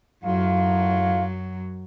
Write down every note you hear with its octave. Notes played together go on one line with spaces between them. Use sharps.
F#2 A2 F#3 F4 F5